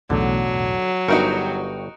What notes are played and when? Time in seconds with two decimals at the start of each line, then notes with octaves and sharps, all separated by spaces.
0.10 B1 E2 A2 D3 F#3
1.08 G1 G2 D#4 F#4 A#4 G5 C#6